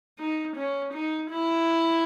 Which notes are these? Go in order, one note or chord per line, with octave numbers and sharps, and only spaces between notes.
D#4
C#4
D#4
E4